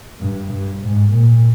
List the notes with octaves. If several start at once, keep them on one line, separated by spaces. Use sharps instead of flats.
G2
G2
G#2
A#2